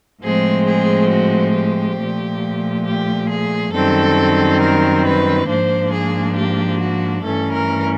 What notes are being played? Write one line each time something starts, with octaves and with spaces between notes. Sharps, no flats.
A2 F3 G#3 C4 G#4
G#4
F#4
G4
A#2 F3 A3
G4
G#4
F#2 D#3 G3 C4 A4
A#4
B4
G#2 F3 A#3 D4 C5
G#4
G4
F#4
G2 E3 A3 C#4 A4
A#4